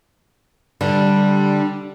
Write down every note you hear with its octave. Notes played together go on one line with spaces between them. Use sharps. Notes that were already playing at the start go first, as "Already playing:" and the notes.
D3 G3